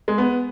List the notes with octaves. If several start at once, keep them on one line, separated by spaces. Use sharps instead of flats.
G#3
B3